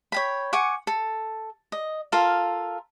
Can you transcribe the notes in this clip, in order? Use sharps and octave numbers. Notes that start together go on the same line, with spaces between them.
C#5 G5 B5
F#5 G#5 C#6 D6
A4
D#5
F4 A4 A#4 F5